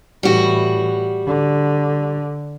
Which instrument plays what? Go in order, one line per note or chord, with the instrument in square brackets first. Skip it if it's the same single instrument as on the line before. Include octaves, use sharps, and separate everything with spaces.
[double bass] A2 E3 [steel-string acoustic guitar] G3 F#4
[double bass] D3